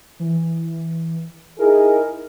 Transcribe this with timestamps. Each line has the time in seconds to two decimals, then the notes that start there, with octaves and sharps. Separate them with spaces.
0.19 E3
1.59 D#4 E4 G#4 A#4